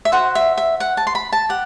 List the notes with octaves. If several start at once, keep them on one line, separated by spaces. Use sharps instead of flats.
E5
F#4 C5 F#5
E5
E5
F#5
A5
C6
B5
A5
G4 F#5